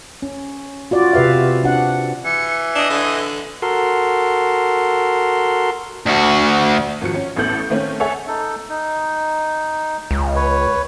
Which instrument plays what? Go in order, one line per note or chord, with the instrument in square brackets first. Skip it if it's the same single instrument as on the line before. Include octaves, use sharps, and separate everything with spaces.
[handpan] C#4
F4 F#4 D5
C3 G4 B4 E5 F5
D4 F#5
[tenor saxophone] E3 [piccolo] C#7
[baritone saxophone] D4 [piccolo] D#5
[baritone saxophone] D3
[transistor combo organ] F#4 A4 A#4 C6
[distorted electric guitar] D2 F#4
[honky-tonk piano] G#1 F3 F#4 C#7
C#4
A1 A2 B3 A4 G6 F#7
D#3 A3 A#3 C4 C#4
G#4 A4 C#5 E5 F#5 G#5
[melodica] D#4 A4
D#4
[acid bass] C#2
[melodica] B4 C#5